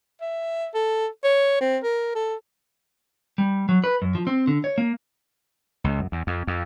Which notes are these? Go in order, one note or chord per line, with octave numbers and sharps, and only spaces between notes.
E5
A4
C#5
C4
A#4
A4
G3
F#3
B4
F#2
F3
C4
D3
C#5
A#3
C#2
F#2
E2
F2
F2